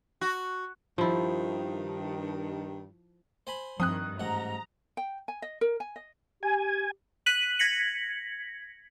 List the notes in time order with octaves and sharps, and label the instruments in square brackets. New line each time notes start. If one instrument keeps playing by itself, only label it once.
[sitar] F#4
[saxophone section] G2 D#3 [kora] F3 E4
[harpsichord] C5 G#5 B5
[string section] G2 D#3 [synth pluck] F3 C4 [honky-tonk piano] D#6 F#6
[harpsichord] A1 G#2 F#5 [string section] A#5
[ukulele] G5
G#5
D#5
A#4
G#5
D#5
[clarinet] G4 [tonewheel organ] G#5
[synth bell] F#6 B6 D#7 F#7
G#6 A#6 B6 C#7 F#7